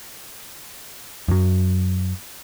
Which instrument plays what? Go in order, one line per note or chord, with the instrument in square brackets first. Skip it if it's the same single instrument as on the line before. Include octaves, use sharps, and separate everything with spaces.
[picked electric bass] F#2 F#3